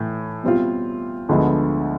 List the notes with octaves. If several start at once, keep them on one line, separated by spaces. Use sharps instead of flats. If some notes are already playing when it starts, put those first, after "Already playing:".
Already playing: A2 E3 A3
B2 G3 C4 F4
D2 D3 F3 G#3 B3